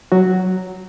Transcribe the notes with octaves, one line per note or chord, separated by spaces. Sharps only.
F#3 F#4